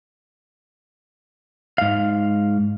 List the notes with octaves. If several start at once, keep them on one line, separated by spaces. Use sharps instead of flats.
G#2 F5